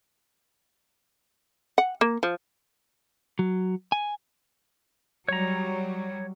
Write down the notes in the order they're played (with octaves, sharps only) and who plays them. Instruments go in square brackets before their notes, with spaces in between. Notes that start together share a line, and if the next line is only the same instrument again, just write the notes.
[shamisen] F#5
A#3
F3
[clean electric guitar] F#3
G#5
[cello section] F#3 G3 [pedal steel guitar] C#5 A#5